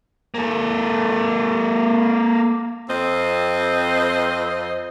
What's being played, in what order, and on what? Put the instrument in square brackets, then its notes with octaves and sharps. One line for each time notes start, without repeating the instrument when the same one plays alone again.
[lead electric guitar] A#3 A4
[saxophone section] F2 C4 C5 D#5